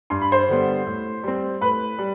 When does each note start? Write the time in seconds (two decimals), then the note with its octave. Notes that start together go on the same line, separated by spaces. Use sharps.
0.10 G2 C6
0.21 B5
0.32 C5 C6
0.48 D3 G3 B3
0.86 A2
1.23 G3 C4
1.61 A2 B4 B5
1.98 G3